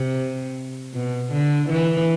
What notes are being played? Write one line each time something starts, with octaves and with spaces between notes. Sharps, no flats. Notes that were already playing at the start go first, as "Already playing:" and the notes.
Already playing: C3
B2
D3
E3